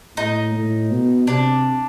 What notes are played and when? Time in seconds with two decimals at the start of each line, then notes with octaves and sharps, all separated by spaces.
0.17 A2 D#4
0.55 A2
0.91 B2
1.27 C3 D4